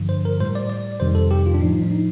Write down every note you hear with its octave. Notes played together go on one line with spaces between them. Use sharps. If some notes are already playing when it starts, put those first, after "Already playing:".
Already playing: G2 D3 F3
C5
A#4
A2 G3 C5
D5
D5
F2 C3 D#3 G3 C5
A4
G4
F4
D4
A2 F3 D#4
D#4
D4
D#4